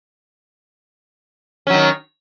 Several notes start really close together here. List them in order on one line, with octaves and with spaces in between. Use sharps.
C#4 F#3 D#3